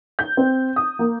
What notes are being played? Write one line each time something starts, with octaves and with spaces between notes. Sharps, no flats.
G6
C4
D#6
A#3